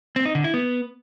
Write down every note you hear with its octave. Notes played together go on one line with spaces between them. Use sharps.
C4
D#4
D3
E4
B3